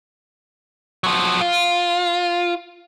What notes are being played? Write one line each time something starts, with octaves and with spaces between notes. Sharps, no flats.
F3 F#3
F4